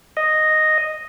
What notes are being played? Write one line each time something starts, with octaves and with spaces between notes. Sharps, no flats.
D#5